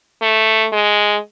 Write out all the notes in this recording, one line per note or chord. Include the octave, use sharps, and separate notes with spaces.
A3
G#3